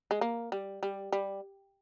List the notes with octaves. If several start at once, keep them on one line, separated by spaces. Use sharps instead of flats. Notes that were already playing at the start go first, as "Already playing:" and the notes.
G#3
A#3
G3
G3
G3